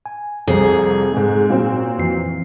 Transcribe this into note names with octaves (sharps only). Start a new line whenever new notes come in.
G#5
C2 F2 C4 G#4 A4
G#2 G#3
A#2 F#3 C4
F2 E3 C7